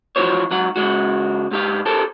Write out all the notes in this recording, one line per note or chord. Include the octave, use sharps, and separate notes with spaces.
E3 F3 C#4 F#4 C5 C#5
G#2 F#3 F#5
C#2 G#2 G#3 F#4
G#2 G4 F5
G4 A4 A#4 C5 A5